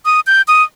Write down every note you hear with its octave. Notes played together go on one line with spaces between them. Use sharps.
D#6
G6
D#6